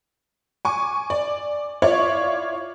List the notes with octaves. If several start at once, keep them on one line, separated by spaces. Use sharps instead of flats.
G#5 C#6 D6
D5
E4 F4 C#5 D5 C#6